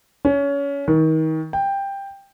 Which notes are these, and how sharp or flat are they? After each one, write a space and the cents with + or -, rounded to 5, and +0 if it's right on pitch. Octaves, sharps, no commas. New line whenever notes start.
C#4 +25
D#3 +30
G5 +10